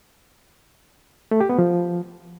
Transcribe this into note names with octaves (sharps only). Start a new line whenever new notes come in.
A3
G4
B3
F3